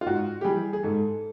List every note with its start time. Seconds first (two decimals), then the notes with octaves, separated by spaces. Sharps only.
0.01 F4
0.06 G#2 F#4
0.41 G4
0.44 E3 G3 G#4
0.73 G#4
0.83 G#2 A4